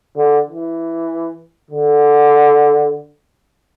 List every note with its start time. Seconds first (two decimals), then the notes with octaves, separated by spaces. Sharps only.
0.17 D3
0.48 E3
1.71 D3